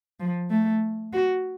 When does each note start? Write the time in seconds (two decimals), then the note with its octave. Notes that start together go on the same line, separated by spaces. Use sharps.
0.20 F3
0.50 A3
1.13 F#4